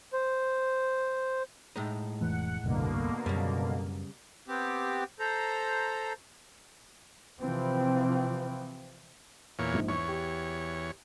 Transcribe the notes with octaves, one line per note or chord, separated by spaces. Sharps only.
C5
A2 G#3 D#4
F1 E3 A3 F#5
F1 C2 G2 B2 D3 A#3
F#2 C#3 G3
B3 C4 G4
A4 C5 A#5
C3 E3 F3 C4
E2 A#2 C#5
A#1 G#2
E2 C#5 C#6
G4